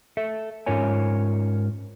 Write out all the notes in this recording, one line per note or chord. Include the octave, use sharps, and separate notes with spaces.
A4 E5
G#2 C#4 F4 A#4 C#5 G#5